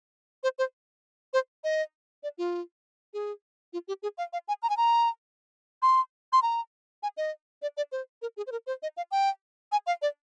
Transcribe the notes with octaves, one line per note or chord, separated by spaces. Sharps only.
C5
C5
C5
D#5
D5
F4
G#4
F4
G4
G#4
F5
F5
G#5
A#5
G#5
A#5
C6
C6
A#5
G#5
D#5
D5
D5
C5
A#4
G#4
C5
A#4
C5
D#5
F5
G5
G#5
F5
D5